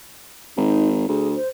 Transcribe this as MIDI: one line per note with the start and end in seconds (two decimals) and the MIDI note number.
0.57 1.08 32
0.57 0.89 63
1.08 1.36 38
1.08 1.29 68
1.36 1.48 72